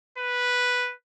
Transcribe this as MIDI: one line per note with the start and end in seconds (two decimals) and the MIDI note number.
0.18 0.93 71